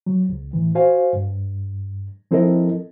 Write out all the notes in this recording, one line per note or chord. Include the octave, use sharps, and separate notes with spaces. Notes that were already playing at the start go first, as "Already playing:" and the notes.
F#3
C#2
A2 E3
F#4 C5 F5 G#5
G2
F3 C4 E4 A4 A#4 D#5